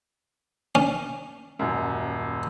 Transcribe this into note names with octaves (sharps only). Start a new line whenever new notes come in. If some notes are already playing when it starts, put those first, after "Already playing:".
C#4
D#1 F#2